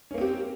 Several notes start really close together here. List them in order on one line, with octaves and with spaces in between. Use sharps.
C#4 A#3 C4 G4